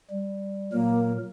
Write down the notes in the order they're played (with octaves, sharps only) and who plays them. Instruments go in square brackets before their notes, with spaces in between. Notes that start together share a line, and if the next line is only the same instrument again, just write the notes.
[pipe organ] G3
[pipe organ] A#2 F#3 A#4 [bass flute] A#3